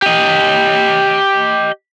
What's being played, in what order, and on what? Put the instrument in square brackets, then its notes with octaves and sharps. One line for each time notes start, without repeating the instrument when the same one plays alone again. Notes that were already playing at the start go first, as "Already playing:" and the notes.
[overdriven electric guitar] G4 D#5